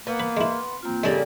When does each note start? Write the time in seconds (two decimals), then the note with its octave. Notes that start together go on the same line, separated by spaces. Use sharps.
0.07 A#3 B3
0.20 B4
0.37 G#3 E4 C6
0.83 A#3 C4 F4
1.03 C#3 G3 G#3 A#3 D4 A4